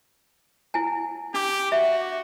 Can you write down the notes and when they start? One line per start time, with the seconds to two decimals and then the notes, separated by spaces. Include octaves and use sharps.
0.74 E4 G#5
1.34 D4 G4 D6
1.72 F#4 E5